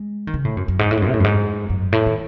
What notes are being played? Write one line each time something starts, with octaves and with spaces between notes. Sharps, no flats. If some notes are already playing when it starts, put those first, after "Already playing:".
Already playing: G#3
D#3
C#3
A2
F#2
F#2
G#2
A2
G#2
F#2
C3
A2
F#2
G#2
F#2
A2
D#3